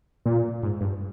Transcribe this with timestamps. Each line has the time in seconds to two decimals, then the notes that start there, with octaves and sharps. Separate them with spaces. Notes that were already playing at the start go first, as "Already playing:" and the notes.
0.26 A#2
0.63 G#2
0.81 G2